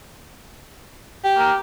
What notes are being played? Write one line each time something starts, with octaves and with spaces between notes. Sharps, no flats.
G4
A#3